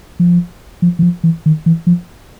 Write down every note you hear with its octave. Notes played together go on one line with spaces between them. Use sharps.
F3
F3
E3
F3
E3
D#3
E3
F3